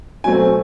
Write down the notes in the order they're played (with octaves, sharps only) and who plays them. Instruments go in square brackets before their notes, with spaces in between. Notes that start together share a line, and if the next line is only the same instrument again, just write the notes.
[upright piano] B2 F#3 A3 C4 G#5